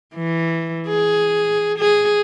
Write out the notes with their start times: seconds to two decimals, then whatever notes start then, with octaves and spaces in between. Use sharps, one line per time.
0.15 E3
0.88 G#4
1.78 G#4